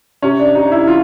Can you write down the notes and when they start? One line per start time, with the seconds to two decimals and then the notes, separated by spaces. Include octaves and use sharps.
0.22 C3 C#4
0.39 D4
0.55 C3 D#4
0.72 E4
0.87 E3 F4